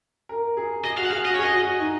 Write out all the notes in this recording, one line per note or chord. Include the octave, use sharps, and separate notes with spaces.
A#4
G#4
G#4 D#5
F#4 F5
F#5
G#4 F5
F#4 D#5
C#5
G#4 D#5
F#4
D#4